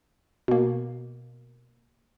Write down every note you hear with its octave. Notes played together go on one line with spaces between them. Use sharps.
B2 A#3